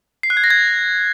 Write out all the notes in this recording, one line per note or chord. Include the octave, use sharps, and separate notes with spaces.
C7
F#6
G#6
A#6
G#6